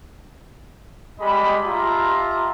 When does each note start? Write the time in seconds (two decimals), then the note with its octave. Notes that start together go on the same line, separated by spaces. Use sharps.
1.20 G3 G#3 D#5 B5
1.64 F4 G4 E5 A5 A#5